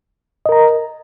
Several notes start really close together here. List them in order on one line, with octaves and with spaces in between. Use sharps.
D#5 A#4 A#5